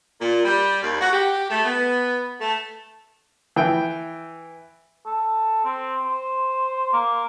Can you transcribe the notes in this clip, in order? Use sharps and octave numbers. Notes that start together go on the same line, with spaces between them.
A#2
G3
D#2
F#4
G4
A3
B3
A3
E3 G5
A4
C4
C5
A#3